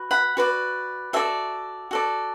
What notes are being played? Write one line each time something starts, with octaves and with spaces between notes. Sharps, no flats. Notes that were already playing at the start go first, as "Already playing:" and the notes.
Already playing: F#4 B4
F#5 B5
F#4 B4 D5
F#4 A4 D5 E5 A5
F#4 A4 D5